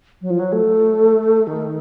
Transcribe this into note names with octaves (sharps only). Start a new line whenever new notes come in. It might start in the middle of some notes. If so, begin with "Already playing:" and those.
F#3
F3
F#3
A3
D#3